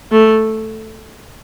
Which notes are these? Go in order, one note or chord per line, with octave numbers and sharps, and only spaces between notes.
A3